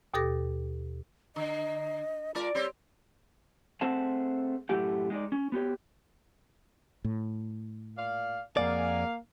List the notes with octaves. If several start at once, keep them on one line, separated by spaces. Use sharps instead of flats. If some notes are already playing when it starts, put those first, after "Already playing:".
D#2 B2 G4 A4 D6 A#6
D3 D#5
G#3 F4 A#4 D5
G3 C4 G4 C#5
A3 C4 G#4 C5 F#5 A5
F#2 A2 A3 G4 F#5
G#3 D#4 D5
C#4
B3 F#4 G4 C#5
A2
A#2 D5 F5
F2 G#2 A#3 G#4 D5 F5 F#5 G#5